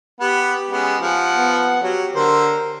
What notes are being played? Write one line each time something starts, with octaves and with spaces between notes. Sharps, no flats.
B3 G4
G#3 B3 C#4
F3 F#5
B3
F#3 G4 C#5
D3 A#4 C5